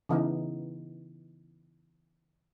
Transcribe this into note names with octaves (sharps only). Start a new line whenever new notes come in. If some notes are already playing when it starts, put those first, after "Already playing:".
C#3 E3 B3 D#4